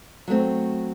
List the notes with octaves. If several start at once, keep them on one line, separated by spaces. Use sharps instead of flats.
F#3 A3 C4